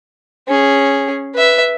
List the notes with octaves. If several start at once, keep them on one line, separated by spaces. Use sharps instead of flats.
C#4 G#4
B4 E5